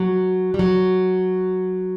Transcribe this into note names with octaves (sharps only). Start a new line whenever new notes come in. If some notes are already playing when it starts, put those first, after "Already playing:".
Already playing: F#3
G3
F#3